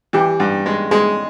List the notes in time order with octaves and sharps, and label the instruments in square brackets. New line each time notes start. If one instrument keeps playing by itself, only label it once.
[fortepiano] E3 [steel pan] G4
[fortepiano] G2
G#3
[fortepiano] G#3 [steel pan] G#4